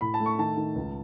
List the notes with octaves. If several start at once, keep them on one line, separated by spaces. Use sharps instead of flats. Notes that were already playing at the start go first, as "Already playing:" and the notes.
A2 B5
A5
A3
C#6
D#3 A5
D#3
C#2